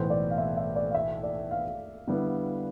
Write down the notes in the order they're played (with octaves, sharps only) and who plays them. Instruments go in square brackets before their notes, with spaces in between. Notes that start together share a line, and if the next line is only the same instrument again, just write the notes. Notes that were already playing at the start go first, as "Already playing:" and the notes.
Already playing: [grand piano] B1 A2 E3 B3 [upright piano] C5
[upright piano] D5
F5
E5
E5
D5
F5
E5
D5
F5
[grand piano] D3 G3 B3 E4